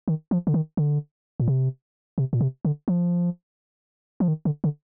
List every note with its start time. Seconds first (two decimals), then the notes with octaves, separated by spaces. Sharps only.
0.08 D#3
0.31 F3
0.47 D3
0.54 D#3
0.77 D3
1.40 A#2
1.48 C3
2.18 C3
2.33 A#2
2.41 C3
2.65 D3
2.88 F3
4.20 F3
4.28 D#3
4.45 D3
4.64 D3